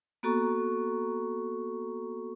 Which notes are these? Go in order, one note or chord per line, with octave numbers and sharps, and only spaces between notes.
A#3 B3 F#4 A4 A#5 C#6